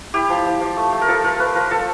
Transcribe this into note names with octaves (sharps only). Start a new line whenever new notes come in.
E4 G4
F3
F3
F3
A3
A3
A#4
F3 A4
F3 A#4
A3 B4
F3 A#4
F3 A4